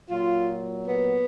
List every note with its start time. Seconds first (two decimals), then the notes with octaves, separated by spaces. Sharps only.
0.10 A#2 F#3 F4
0.85 B3